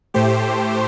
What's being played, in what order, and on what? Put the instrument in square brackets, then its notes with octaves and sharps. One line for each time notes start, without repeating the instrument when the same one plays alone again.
[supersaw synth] A2 A3 G4 C5